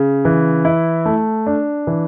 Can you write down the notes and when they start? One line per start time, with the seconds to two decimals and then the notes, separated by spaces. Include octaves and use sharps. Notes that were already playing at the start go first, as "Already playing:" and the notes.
Already playing: C#3
0.25 E3
0.65 E4
1.06 A3
1.47 D4
1.87 E3